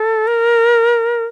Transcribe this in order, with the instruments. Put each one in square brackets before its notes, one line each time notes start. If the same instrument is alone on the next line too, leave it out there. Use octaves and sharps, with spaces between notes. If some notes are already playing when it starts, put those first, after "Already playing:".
Already playing: [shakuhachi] A4
A#4